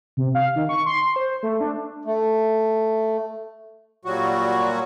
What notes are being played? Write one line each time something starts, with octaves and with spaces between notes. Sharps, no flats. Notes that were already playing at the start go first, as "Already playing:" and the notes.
C3
F5
D#3
C#6
C6
C5
A3
D4
A3
A#2 F#3 G3 F#4